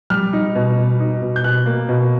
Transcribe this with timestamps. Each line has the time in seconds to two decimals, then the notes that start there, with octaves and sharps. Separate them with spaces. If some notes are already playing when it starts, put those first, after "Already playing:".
0.10 G3 F6
0.33 D#4
0.55 B2
0.78 B2
1.00 D#4
1.22 B2
1.36 G6
1.44 B2 F#6
1.66 A#3
1.89 B2